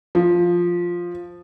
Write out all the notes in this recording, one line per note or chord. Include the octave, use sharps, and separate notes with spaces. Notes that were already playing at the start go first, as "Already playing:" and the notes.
F3